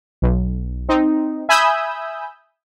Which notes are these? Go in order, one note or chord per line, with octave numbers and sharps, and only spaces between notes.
B1
C4 D#4
E5 G#5 B5 D#6 E6 G6